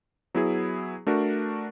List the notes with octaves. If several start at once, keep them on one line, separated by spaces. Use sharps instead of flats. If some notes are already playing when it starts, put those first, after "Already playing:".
F#3 B3 E4 G#4
A3 D4 F#4 A#4